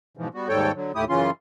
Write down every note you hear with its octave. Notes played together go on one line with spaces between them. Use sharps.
G#2 B2 E3 F3
G3 B3 F#4
D#2 G#2 G3 A4 C#5 G5
D3 F#3
D#2 A2 A3 E4 G4 D#6
F#2 C#3 E3 C#4 F4 C6